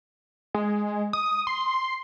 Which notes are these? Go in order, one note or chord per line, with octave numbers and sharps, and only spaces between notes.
G#3
D#6
C6